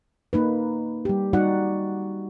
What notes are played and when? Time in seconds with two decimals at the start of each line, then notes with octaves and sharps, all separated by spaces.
0.33 A#3 D#4 B4
1.05 G3 G4
1.33 G3 D#4 F#4 D5 F#5